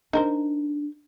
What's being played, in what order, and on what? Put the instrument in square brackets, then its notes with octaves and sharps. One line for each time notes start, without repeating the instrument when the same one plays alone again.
[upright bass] D4 [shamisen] D#4 A#4 C5